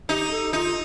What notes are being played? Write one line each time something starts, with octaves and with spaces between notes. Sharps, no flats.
D#4 G4
A4
D#4 F4